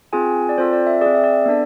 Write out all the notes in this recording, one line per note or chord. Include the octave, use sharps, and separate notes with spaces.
C4 F4 G#4 G#5
D5
C4 F4 A4 C5
D5
E5
C4 G#4 D5
E5
D5
B3 D4 A4